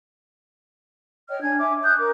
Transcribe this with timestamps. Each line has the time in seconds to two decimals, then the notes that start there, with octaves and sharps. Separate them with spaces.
1.29 C#5 D#5 G5 F6
1.42 D4 G#5 G#6
1.59 E5 G#5 D6
1.83 D#6 F#6 G6
1.98 A#4 D6